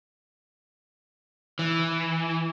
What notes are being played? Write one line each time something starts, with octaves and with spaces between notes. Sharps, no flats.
E3